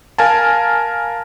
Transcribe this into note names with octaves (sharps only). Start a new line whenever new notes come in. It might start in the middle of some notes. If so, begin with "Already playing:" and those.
A#4 F5 G#5 A5